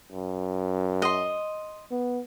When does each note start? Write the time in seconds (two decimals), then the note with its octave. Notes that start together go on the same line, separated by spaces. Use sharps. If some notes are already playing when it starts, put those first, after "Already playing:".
0.12 F#2
1.02 D#5 C6
1.91 B3